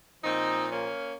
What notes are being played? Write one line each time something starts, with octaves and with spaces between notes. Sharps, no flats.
A#2 F3 C4 D#4
A#3 C#4